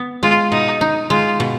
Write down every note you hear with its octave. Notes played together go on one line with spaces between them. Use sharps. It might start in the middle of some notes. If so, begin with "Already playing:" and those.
Already playing: B3
G#3 F4
B2 D#4
D#4
G#3 F4
B2